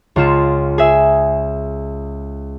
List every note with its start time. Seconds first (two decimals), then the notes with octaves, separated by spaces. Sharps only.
0.16 C#2 F4 E7
0.78 G#4 E5